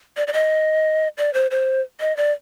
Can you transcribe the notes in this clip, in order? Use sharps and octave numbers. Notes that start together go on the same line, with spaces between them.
D5
D5
D#5
D5
C5
C5
D#5
D5